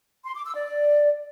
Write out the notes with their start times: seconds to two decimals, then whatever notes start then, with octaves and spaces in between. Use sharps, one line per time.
0.24 C6
0.35 D6
0.45 E6
0.55 D5